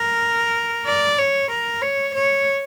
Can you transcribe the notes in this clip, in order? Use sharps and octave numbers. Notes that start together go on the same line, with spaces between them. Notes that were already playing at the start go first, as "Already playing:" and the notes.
Already playing: A#4
D5
C#5
A#4
C#5
C#5